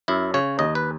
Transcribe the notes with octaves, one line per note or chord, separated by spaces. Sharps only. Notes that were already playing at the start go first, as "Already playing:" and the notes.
F#2 E4
C#3 C#5
D#2 D#5
B4